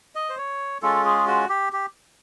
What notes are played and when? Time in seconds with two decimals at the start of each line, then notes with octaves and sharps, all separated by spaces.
0.15 D#5
0.29 C5
0.38 C#5
0.82 G#3 C#4 F4 A4
1.05 G#4
1.27 F#4
1.49 G4
1.73 G4